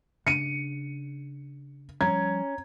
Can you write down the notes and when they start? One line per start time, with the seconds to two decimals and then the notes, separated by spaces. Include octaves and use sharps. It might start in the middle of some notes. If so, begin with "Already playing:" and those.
0.27 C#3 D4 C#7 D#7
2.01 F3 G3 C#4 A#5 G#6